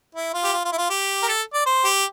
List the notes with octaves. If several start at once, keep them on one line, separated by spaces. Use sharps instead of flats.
E4
F4
G4
F4
F4
E4
F4
G4
A#4
A4
D5
C5
G4